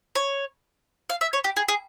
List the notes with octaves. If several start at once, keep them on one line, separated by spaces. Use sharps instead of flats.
C#5
F5
E5
C#5
G4
G#4
G#4